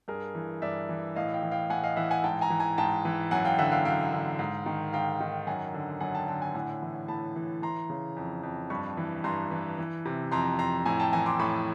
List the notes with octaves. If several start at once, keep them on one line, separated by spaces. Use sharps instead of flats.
G2 G#4 A#4
E3
G2 D5 E5
E3
A2 D#5 F5
F5 G5
E3
F5 G5
A2 F#5 G#5
D#5 F5
E3 E5 F#5
F#5 G#5
G#2 G5 A5
G#5 A#5
E3
G#5 A#5
G#2 G5 A5
E3
F#2 F#5 G#5
F5 G5
D3 E5 F#5
F5 G5
F#2 F5 G5
D3
G#2
D#3
G#2 F5 G5
D#3
F#2 F#5 G#5
D3
F#2 F#5 G#5
G5 A5
D3 G5 A5
F#5 G#5
A2 F#5 G#5
E3
A2 A5 B5
E3
E3 A#5 C6
C#3
F2
F2
G2 B5 C#6
E3
G2 A#5 C6
E3
E3
C3
F2 A#5 C6
F2 A#5 C6
A2 G#5 A#5
G5 A5
E3 G#5 A#5
C6 D6
A2 B5 C#6